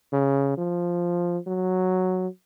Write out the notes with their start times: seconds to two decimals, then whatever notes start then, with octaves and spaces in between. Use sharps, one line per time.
0.12 C#3
0.57 F3
1.47 F#3